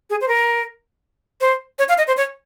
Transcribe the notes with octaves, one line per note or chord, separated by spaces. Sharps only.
G#4
C5
A#4
C5
C#5
F5
D#5
C5
C#5